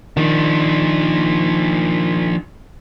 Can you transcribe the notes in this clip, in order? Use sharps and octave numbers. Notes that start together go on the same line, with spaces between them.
D#3 F3 D4